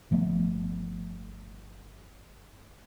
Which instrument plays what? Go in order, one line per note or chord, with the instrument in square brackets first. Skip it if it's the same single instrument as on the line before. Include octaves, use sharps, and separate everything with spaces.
[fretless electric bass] G1 F3 A3 B3